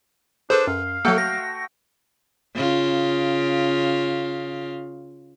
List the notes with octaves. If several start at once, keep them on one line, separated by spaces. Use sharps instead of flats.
D4 G#4 A4 B4 C5 C6
F#2 F5
F#3 A3 A#3 F#4 A4 G5
A#6
C#3 F4